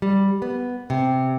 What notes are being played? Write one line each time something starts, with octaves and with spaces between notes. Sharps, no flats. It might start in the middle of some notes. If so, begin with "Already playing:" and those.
G3
B3
C3